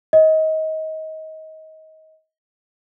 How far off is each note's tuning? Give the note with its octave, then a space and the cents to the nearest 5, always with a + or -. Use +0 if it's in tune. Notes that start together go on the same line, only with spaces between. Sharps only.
D#5 +25